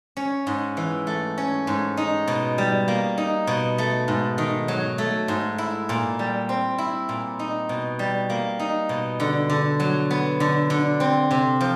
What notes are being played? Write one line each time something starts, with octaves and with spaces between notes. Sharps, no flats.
C#4
G#2
E3
A3
C#4
G#2
D#4
B2
G3
A#3
D#4
B2
A3
G#2
D#3
F#3
A3
G#2
E4
A#2
G3
C4
E4
A#2
D#4
B2
G3
A#3
D#4
B2
D3
D3
F#3
B3
D3
D3
C4
C3
F3